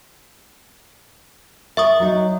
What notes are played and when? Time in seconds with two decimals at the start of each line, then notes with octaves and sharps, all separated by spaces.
1.77 A#4 E5 C#6 D#6
2.00 F#3 D#4